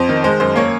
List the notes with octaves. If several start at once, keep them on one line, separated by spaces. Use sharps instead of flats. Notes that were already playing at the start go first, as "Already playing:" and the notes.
Already playing: F2 C5
D#3
G#3 C5
F#2 C5
A#3 C#5